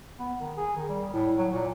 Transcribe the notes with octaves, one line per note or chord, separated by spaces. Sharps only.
B3
D#3
G#4
D#3
G3
A2
F#3
A#2